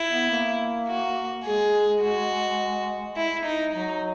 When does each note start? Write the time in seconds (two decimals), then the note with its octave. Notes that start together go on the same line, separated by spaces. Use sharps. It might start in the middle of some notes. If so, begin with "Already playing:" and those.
Already playing: E4
0.11 B3
0.30 A#3
0.88 F#4
1.45 G#3 G#4
2.02 F#4
3.16 E4
3.45 D#4
3.73 F#3 D#4